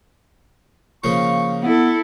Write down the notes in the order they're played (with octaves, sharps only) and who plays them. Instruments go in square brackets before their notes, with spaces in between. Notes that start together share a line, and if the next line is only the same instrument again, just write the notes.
[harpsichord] C#3 F3 A#3 [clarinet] C#6
[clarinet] B3 [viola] E4 A4